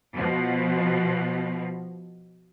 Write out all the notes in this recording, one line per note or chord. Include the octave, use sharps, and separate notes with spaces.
B2 F3